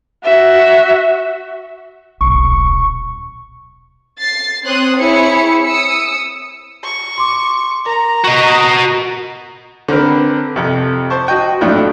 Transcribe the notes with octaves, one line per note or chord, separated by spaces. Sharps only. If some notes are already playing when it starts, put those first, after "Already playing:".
F#4 E5
D#1 B1 C#6
A6 C7
C4 C5 C#5 C6 D#6 F#6
C4 E4 G#4 C#5 C#7
D#6 E6 C#7
C#6
C6 D6
A#4 A#5
F#4 D#5
D3 C4 A#4 B4
F2 C3
C5 A5 C#6
F#4 D#5 G5 C#6
F2 A2 F#3 D4 E4 F4